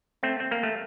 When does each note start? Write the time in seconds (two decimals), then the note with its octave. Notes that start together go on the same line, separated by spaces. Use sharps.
0.23 A3 C4
0.40 C4
0.51 A#3
0.63 A3